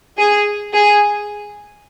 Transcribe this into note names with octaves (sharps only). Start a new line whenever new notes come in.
G#4
G#4